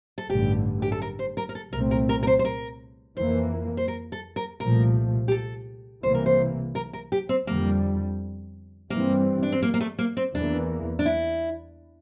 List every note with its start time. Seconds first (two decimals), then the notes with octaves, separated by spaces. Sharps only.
0.18 A4
0.30 A1 G2 D3 G4
0.82 G4
0.92 A4
1.02 A#4
1.19 C5
1.37 A#4
1.49 A#4
1.55 A4
1.73 C2 A#2 A3 C4 A#4
1.91 A#4
2.09 A#4
2.23 A#4
2.27 C5
2.39 C5
2.45 A#4
3.17 F2 E3 A#3 C5
3.77 C5
3.88 A#4
4.12 A4
4.36 A#4
4.60 C2 A#2 F3 A3 A#4
5.28 G4
5.31 A4
6.03 C2 C3 E3 A#3 C5
6.14 A#4
6.26 C5
6.75 A#4
6.93 A#4
7.12 G4
7.29 C4
7.47 F2 D3 G3 A#3
8.90 G2 E3 G3 A#3 C4
9.43 D4
9.52 C4
9.62 A#3
9.74 A#3
9.81 A3
9.99 A#3
10.17 C4
10.34 E2 E3 A#3 D4
10.99 D4
11.06 E4